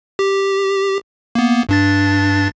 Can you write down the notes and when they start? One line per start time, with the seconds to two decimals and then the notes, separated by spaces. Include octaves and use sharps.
0.19 G4
1.35 A#3 B3
1.69 G2 D4 A6